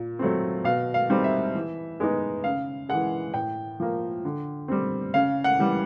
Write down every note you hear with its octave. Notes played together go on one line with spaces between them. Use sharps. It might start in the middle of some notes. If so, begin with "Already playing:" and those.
Already playing: A#2
F#3 A3 C4
B2 F5
F5
G3 C4 D#4
E5
E3
G#3 B3 D#4
C#3 F5
E3 G#3 F#5
A2 G5
F3 A#3
D3
G3 C4
C#3 F5
F#5
E3 G3